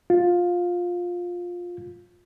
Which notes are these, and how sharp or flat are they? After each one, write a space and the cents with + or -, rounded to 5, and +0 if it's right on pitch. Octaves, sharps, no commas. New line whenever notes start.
F4 +15